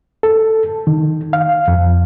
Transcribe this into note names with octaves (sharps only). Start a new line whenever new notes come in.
A4
D#3
F5
F2